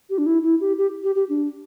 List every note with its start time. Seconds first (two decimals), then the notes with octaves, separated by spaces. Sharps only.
0.10 G4
0.18 D4
0.26 E4
0.43 E4
0.61 G4
0.78 G4
1.04 G4
1.15 G4
1.29 D4